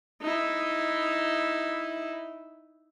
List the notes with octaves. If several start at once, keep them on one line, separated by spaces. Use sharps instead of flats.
D#4 E4